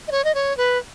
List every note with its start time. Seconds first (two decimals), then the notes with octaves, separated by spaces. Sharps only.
0.08 D#5
0.12 C#5
0.25 D#5
0.35 C#5
0.57 B4